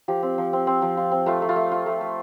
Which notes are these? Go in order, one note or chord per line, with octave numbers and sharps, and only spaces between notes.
F3 G4
C4
F3
C4
C4
F3
F4
C4
A3 F4
A3
F4
A3
F4
A3
A3